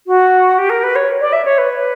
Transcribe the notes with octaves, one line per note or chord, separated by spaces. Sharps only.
F#4
G4
A#4
B4
C#5
D5
E5
C#5
B4